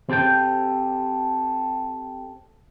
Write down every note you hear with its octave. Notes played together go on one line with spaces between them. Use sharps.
C4 G4 A4 G5